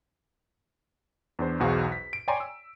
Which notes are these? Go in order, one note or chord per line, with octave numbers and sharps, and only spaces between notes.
E2 D4 C5
B1 E2 F#4 G#4 C5 F5
B6
D7
C#5 D5 G5 G#5 A#5 C6
E6